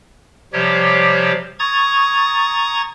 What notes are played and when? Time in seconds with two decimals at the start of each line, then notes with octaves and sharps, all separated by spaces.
0.53 C3 F3 G3 G4 C#5
1.59 A#5 C#6 D#6 G#6 A6